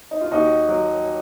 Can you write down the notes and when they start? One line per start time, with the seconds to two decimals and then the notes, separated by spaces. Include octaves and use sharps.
0.11 D#4
0.21 F4
0.31 D#2 D#4 F#4
0.68 F#3